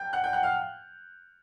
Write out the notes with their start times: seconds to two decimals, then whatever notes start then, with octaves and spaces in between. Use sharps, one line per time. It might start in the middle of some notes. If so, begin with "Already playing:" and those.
Already playing: G5 G6
0.13 F#5 F#6
0.24 G5 G6
0.33 F#5 F#6
0.43 F5 F6